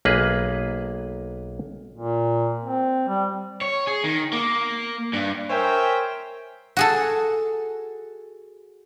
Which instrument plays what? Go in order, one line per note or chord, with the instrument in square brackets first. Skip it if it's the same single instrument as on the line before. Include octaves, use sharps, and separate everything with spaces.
[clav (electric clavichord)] B1 A#3 G#4 B4
[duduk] A#2
C4
G3
[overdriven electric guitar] C#5
G#4
D#3
A#3
G2
[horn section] A#4 C5 C#5 E5 G5 G#5
[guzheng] F#4 G#4 A4